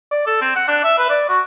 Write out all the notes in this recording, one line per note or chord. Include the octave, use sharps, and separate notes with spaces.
D5
A4
C4
F#5
D4
E5
B4
D5
F#4